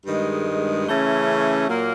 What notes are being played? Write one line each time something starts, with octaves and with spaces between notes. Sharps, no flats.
G2 D#3 G#3
C#3 E3 A3 C#4
A#2 F#3 A#3